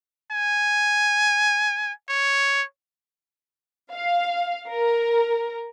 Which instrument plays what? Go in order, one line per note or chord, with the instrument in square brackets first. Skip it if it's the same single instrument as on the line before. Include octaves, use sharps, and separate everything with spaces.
[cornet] G#5
C#5
[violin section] F5
A#4